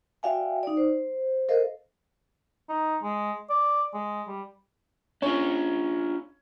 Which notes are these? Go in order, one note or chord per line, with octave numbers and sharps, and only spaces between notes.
F#4 D5 E5 F5 G5 G#5
D#4 D5
C5
A4 A#4 C5 D#5 F5
D#4
G#3
D5
G#3
G3
C#4 D4 F4 C#5